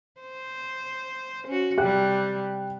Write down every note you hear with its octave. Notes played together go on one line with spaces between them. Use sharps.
C5
C#4 F#4
C3 G3 G4 F#6